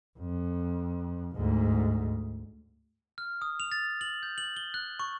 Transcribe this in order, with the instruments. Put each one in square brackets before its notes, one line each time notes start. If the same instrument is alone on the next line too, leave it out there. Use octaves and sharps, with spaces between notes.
[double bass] F2
D2 G#2
[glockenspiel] F6
D#6
F7
A6
F#7
G6
F#7
G7
F#6
C#6